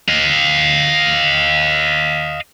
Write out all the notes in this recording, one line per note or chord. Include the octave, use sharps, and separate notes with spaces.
D#5 F5